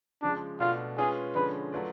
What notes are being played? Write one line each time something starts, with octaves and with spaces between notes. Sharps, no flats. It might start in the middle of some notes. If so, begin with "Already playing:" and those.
C#3 F3 G#3 D4
B2 A3 D4 F4
G#3 C#4 F4 G#4 B4
D3 F3 G#3 C#4 B4
F#3 A3 F4 B4 D5